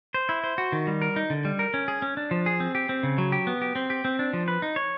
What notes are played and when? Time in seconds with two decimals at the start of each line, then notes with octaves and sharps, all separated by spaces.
0.14 C5
0.29 E4
0.44 C5
0.58 F#4
0.72 D#3
0.87 G3
1.02 A#4
1.16 D#4
1.30 D3
1.45 G3
1.59 A#4
1.74 C#4
1.88 G#4
2.02 C#4
2.17 D4
2.31 F3
2.46 G#4
2.60 C4
2.75 G4
2.89 C4
3.03 C#3
3.18 F#3
3.32 G4
3.47 B3
3.62 G4
3.75 C4
3.90 G4
4.05 C4
4.19 D4
4.33 F3
4.48 B4
4.62 D#4
4.76 C#5